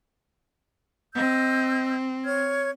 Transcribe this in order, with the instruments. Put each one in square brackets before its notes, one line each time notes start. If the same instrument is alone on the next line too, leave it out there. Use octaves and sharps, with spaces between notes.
[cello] C4 [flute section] D#5 E6 G6
[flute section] C#5 F6 G#6